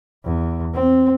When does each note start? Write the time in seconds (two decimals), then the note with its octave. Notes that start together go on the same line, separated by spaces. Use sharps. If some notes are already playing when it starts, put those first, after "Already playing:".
0.24 E2
0.74 C4